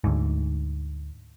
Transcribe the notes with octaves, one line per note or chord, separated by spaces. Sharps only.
D2 G#2